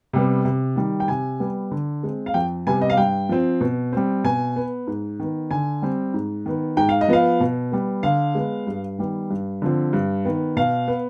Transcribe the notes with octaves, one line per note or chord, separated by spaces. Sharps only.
C3 G3 B3
C3
D#3 G3
G5
C3 G#5
G3 B3
D3
G#3 C4
F5
F2 G5
C3 G3 B3 G#5
D#5
F5
G2 G5
F3 C4
B2
G3 C4
B2 G#5
B3
G#2
D#3 B3
D3 G#5
G3 C4
G#2
D#3 B3
G#2 G5
F5
D#5
F3 B3 F5
B2
G3 B3
D3 F5
G#3 B3
G2
D#3 G3 B3
G2
D3 F3 C4
G2
D#3 B3
B2 F5
B3